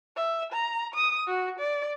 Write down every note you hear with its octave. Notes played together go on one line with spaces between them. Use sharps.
E5
A#5
D#6
F#4
D5